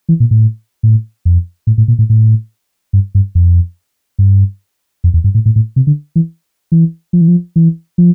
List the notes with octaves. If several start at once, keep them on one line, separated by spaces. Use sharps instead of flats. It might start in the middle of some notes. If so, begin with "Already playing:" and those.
E3
A#2
A2
A2
F2
A2
A2
A#2
A2
A2
G2
G2
F2
G2
F2
E2
G2
A2
A2
A2
C3
D3
E3
E3
F3
E3
F3
E3
F3